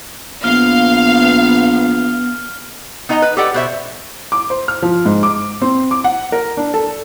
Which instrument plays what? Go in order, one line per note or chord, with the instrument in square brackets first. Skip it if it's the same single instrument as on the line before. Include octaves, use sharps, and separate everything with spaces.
[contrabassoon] A#1 [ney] B3 [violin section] F5 [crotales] F6
[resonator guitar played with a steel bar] B3 D#4 D#5 F5 A#5
B4
G4 A4 B4 D5 F#5
B2 C5 E5
[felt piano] D6
C5
F6
F3
G#2
D6
C4
D6
F#5
A#4
D4
A4